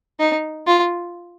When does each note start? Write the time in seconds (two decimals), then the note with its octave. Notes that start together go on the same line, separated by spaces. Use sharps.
0.19 D#4
0.67 F4